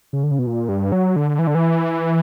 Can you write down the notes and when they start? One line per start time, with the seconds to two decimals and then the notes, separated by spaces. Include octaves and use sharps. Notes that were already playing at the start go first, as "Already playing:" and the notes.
0.13 C#3
0.23 D3
0.31 C#3
0.39 B2
0.47 A#2
0.69 G2
0.92 F#3
1.16 D3
1.39 E3
1.47 D3
1.55 E3